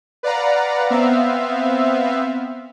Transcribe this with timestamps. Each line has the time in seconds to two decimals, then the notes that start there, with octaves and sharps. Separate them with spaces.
0.23 B4 D5 F5 F#5 A#5
0.90 B3 C4 E5 F5